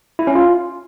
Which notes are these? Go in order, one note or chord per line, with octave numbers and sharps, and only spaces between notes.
E4
C#4
F4